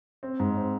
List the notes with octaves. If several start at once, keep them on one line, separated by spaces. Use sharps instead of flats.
C4
G#2
C4